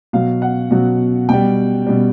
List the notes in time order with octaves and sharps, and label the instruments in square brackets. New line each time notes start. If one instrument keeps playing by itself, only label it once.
[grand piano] B2 F#3 F5
F#5
B2 F#3
B2 G3 G5
B2 G3